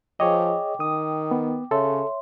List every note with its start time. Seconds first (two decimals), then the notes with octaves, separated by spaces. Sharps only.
0.20 F3 G#4 C#5 D#5 G5 D6
0.80 D#3 D#6
1.31 B3
1.71 C#3 A4 C#5 E5 C6